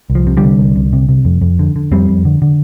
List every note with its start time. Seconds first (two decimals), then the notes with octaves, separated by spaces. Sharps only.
0.10 C2
0.15 F3
0.27 C3
0.37 D3 G3
0.43 C3
0.59 C2
0.76 C2
0.93 C3
1.09 C3
1.25 F2
1.42 F2
1.59 D3
1.76 D3
1.91 F2 G3 C4
2.09 F2
2.25 D3
2.42 D3